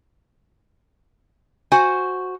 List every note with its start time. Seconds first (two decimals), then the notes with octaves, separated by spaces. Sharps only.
1.72 F#4 C5 F#5 G#5